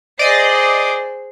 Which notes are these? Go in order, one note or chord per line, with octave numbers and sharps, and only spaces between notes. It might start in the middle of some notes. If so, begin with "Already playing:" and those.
G#4 C5 D5 D#5